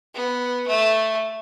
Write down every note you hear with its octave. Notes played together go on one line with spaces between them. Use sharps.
B3
A3